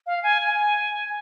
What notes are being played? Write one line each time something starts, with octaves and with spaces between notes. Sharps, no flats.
F5
G#5
G#5